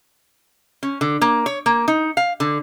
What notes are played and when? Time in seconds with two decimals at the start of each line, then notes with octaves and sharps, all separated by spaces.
0.83 C#4
1.01 D3
1.21 A#3
1.46 C#5
1.66 A#3
1.88 D#4
2.17 F5
2.40 D3